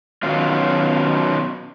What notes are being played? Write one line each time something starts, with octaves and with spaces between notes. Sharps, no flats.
B2 D#3 F#3 C#4 F4